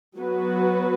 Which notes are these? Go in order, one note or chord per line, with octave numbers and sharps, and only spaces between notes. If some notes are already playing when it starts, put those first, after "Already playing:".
F#3 B3 F#4 B4